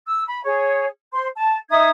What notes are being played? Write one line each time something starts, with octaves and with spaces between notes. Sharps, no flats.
E6
B5
G#4 C#5
C5 C6
A5
D#4 E5 D#6 G#6